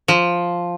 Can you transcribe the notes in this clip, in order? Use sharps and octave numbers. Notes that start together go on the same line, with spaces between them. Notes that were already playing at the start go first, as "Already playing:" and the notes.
F3